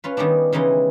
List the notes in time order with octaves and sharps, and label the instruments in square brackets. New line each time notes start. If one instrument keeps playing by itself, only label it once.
[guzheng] C#4 F4 B4
D#3 G3 B3 C#4 D4
C#3 E3 G3 G#3 D#4